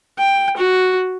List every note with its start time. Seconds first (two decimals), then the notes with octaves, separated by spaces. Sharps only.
0.18 G5
0.57 F#4